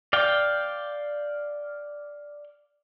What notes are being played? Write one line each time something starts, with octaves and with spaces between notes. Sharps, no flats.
D5 F5 G5